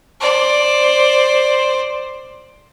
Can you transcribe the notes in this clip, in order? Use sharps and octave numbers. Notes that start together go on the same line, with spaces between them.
C5 D5